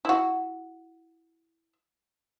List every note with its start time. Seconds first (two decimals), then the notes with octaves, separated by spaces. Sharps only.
0.05 E4 F#4